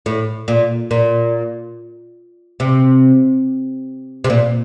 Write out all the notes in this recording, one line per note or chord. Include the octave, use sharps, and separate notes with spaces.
A2
A#2
A#2
C3
C3
A#2